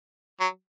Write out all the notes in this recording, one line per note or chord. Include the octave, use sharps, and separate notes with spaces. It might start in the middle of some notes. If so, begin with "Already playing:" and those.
F#3